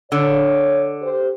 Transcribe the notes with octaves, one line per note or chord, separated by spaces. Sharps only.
D3 C#5
G4 C5